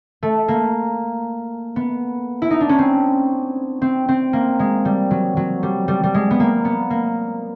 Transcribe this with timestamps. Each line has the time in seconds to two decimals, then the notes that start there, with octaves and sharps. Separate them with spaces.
0.23 A3
0.48 A#3
1.76 B3
2.42 E4
2.50 D#4
2.61 D4
2.69 C#4
2.79 C4
3.82 C4
4.09 C4
4.33 A#3
4.59 G#3
4.85 G3
5.11 F#3
5.37 F#3
5.63 G3
5.88 G3
6.03 G3
6.14 G#3
6.31 B3
6.40 A#3
6.65 B3
6.90 A#3